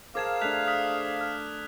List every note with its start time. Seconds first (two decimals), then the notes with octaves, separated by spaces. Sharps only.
0.15 G#4 A#4 C5 F5 A5 D6 G#6 E7
0.41 A3 D4 F#6 B6 F7
0.67 D#6 F6 B6
1.21 F6